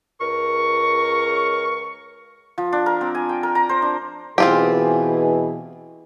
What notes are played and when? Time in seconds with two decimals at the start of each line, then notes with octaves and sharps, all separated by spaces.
0.21 C#2 A#4 C#6
2.58 F3
2.72 D4
2.86 A#4
3.01 C4
3.15 G#5
3.29 G5
3.43 A#4
3.55 A#5
3.69 C5
3.82 D4
4.38 B2 E3 C4 F4 G4 G#4